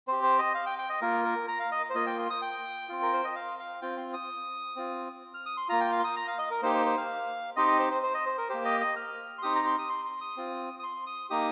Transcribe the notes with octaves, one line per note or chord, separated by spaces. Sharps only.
C4 G4 C5
C5
D#5
F5
G5
G5
D#5
A#3 F4 A#4
A#4
A#5
F5
D#5
C5
A#3 F4 D#5
G5
C6
D#6
G5
C4 F4
A#4
C5
D#5
F5
F5
C4 F4 G5
C6
D#6
C4 F4
F6
D#6
C6
A#3 F4 A#5
G5
F5
C6
D#6
A#5
F5
D#5
A#4
A#3 D#4 G4 C5
C5
C5
F5
C4 D#4 G4 D#5
D#5
C5
C5
C5
D#5
C5
A#4
A#3 G4 C5
D#5
D#5
F6
C6
C4 D#4 G4 D#6
A#5
C6
D#6
C6
C6
D#6
C4 F4
D#6
C6
D#6
A#3 D#4 G4 D#6